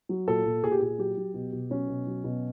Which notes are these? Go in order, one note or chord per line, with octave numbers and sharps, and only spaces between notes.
F#3
A#2 A4
A#2
A#2 G#4
G4
A#2 G#4
F#3 G4
F#3
B2
B2
F#3 C#4
B2
F#3
B2